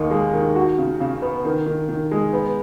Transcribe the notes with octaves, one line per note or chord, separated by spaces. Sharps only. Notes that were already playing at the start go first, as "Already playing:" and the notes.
Already playing: D#2 D#3 D#4
G#3
D#3
F#4
C#3
C#3
B3
D#3
D#3
D#3
G#3
B3